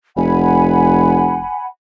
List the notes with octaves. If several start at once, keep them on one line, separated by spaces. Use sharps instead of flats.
F1 F#5 G#5 B5